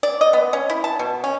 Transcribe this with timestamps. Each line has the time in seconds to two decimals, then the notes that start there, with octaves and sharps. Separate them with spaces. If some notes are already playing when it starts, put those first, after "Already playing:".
0.03 D5
0.21 D#5
0.33 B3
0.53 C#4
0.70 E4
0.84 A5
0.99 B2
1.24 C#4